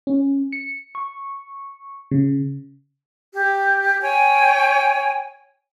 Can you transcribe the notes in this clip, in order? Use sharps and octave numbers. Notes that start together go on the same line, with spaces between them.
C#4
C#7
C#6
C#3
G4
C#5 G5 G#5